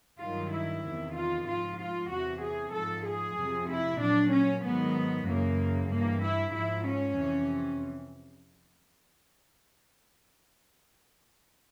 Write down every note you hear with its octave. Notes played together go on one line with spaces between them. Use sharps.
G2 D#3 F#3 F4
E4
E2 C3 D#3
F4
G#2 F3 F4
F4
E2 C3 E3 F#4
G#4
G#2 F3 A4
G#4
F2 C3 F3
E4
A#2 F#3 D4
C#4
G#2 D#3 F#3 B3
F#2 C#3 E3 A#3
G2 E3 A#3
E4
G#2 F3 E4
C#4
F2 C3 E3